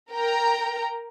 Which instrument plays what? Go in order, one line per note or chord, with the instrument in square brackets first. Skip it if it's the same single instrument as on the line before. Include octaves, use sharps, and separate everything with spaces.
[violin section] A#4 G5 A#5